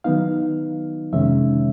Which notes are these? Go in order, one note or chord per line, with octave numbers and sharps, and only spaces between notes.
D#3 F#3 B3 D#4 F5
F2 C3 D#3 G#3 C#4 E5